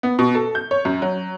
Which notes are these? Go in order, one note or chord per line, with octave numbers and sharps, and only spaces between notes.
B3
B2
A4
G6
C#5
F#2
F#3